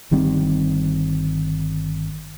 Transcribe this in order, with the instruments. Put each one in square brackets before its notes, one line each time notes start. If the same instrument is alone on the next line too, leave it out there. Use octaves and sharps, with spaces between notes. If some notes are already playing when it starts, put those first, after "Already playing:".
[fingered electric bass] G1 D#3 G3 C4